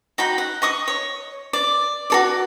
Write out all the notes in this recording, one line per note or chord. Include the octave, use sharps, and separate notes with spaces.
D#4 F#4 G5 B5
F#5
D#5 C#6 D#6
C#5
D5
F#4 A4 D5